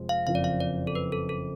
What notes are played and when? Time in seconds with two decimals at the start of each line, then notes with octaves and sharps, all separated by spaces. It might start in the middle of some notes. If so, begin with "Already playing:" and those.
Already playing: F1 F3 G#3
0.09 F5
0.27 F#1 F2 F3 F5
0.35 D5
0.44 F5
0.60 D5
0.87 A4
0.95 B4
1.12 A4
1.29 A4